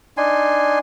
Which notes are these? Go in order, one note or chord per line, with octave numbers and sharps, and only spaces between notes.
D4 D#4 G#5 C6